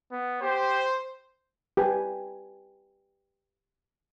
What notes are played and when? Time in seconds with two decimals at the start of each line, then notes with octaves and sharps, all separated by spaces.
0.12 B3
0.42 G4 C5
1.77 G4 B4 G#5